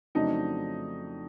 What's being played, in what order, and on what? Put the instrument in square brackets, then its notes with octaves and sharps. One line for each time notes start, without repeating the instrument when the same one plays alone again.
[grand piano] F2 C#3 F#3 A3 D4 [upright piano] D#4